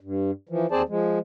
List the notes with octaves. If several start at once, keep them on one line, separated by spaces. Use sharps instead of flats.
G2
E3 F3
D#2 C4 G#4 C5 D5 A5
F3 G#3